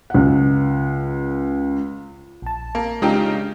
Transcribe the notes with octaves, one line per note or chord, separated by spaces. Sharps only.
C#2 F#5
A#1 A5
A#3
C#3 G#3 D4 D#4 F4 G4